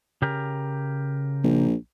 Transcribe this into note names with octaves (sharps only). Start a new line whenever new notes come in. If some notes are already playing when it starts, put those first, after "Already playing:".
C#3 G4 A#4
A#1